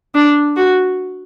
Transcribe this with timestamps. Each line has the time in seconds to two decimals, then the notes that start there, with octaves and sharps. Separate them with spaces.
0.15 D4
0.56 F#4